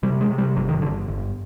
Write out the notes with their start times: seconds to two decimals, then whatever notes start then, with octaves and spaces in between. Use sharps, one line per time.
0.03 C3 G3
0.21 G#3
0.30 C3
0.38 G3
0.56 G1 F#3
0.69 D#3
0.82 G1 D3
1.08 G1